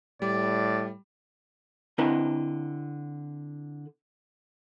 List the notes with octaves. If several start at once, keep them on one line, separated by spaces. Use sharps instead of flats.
A2 G3 D5
D3 C4 E4 B4 D#5 A#5